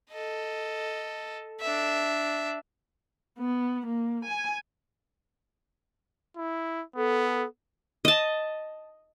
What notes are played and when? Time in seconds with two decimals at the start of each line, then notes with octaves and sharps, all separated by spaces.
0.11 A4 D#5
1.61 D4 E5
3.39 B3
3.86 A#3
4.25 G#5
6.37 E4
6.96 B3 A4
8.05 D#5 A5